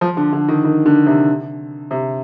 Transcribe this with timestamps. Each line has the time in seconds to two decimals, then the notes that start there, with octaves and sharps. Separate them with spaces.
0.01 F3
0.17 D3
0.33 D3
0.48 D#3
0.64 D#3
0.86 D3
1.06 C3
1.91 C3